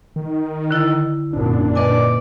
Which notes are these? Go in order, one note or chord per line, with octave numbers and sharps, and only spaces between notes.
D#3
D3 E4 A6
G#1 F#2 A#2 D4
A#2 B4 D5 D#5 G#5